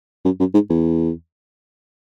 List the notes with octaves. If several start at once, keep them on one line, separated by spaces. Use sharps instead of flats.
F#2
F#2
G#2
E2